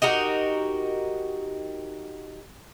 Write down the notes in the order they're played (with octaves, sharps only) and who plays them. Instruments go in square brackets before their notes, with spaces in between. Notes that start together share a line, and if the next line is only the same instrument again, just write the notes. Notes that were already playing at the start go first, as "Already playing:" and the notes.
[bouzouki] D#4 F#4 G4 A#4